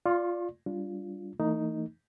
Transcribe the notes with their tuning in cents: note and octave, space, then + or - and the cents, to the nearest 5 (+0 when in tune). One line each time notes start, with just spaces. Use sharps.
F4 +0 D5 +0 C6 +40
G3 +0 D4 -15 F4 +0
E3 +0 A3 +45 D#4 +0